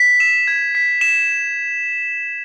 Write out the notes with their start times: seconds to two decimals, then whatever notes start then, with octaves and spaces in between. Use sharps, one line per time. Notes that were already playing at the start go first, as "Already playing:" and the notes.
Already playing: B6
0.20 E7
0.47 G#6
0.75 B6
1.01 E7